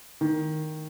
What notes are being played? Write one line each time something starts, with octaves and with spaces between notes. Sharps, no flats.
D#3